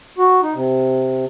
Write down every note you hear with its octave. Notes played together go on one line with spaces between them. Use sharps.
F#4
D#4
C3